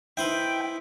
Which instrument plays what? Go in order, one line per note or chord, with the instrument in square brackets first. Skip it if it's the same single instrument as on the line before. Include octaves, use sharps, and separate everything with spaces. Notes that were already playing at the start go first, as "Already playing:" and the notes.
[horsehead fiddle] D#4 E4 [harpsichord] B4 C5 E5 [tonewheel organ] G5